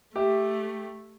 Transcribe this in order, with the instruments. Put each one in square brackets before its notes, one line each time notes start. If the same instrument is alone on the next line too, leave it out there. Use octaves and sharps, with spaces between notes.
[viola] A3 [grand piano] G4 E5